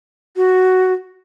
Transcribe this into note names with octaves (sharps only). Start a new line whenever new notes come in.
F#4